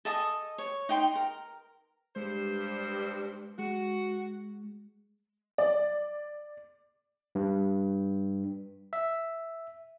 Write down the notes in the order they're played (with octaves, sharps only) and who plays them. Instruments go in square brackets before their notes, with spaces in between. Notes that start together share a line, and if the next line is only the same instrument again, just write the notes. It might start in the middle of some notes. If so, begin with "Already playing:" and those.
[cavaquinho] A4 D#5 G#5 D#6
C#5
D#4 G5 C6
A#4
[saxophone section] G2 C5 [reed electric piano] G#3
[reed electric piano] G#3 [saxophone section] F#4
[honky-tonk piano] D5
[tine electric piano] G2
E5